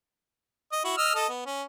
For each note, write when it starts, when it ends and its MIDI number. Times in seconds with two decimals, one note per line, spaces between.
0.72 0.81 75
0.84 0.93 64
0.84 0.93 66
0.97 1.14 75
0.97 1.14 88
0.97 1.14 89
1.15 1.28 69
1.15 1.28 75
1.29 1.42 59
1.46 1.63 61